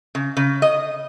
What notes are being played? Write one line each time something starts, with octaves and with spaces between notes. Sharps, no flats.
C#3
C#3
D#5